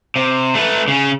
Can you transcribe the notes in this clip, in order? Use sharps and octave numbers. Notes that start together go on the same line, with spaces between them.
C3
A3 B4
C#3 C#4